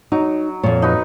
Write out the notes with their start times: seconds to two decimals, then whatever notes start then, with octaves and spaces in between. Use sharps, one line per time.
0.12 F#3 D#4
0.63 F2 A#2 C#5
0.82 D#4 F#4 B4